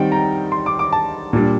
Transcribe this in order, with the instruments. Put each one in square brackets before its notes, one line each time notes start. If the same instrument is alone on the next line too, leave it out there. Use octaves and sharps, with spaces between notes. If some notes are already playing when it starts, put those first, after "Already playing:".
Already playing: [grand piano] D#3 G3 C4 D#4 F#5 G5
A#5
C6
D6
D6
A5
A#2 G3 D4